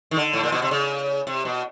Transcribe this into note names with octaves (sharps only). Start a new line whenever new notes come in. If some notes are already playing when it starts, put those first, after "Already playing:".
D#3
D3
A2
A#2
B2
C3
C#3
C3
B2